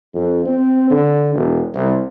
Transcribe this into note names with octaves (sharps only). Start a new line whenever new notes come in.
F2
C4
D3
E1
C2